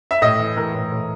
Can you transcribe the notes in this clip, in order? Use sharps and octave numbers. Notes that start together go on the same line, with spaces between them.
E5
A2 D#5
E3
E3 A#4
A2
A2